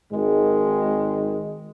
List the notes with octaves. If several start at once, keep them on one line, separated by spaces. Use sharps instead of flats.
G#1 G#2 D#3 G#3